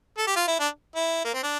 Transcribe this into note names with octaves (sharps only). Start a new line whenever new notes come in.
A4
G4
F4
E4
D4
E4
A#3
C4
D4